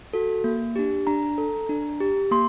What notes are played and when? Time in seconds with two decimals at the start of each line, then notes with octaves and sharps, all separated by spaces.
0.13 F#4 A4
0.44 A#3
0.76 D4 G4
1.07 D4 A#5
1.38 A4
1.69 D4
2.00 G4
2.31 A#3 C6